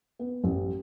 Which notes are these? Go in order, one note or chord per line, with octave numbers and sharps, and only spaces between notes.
B3
A1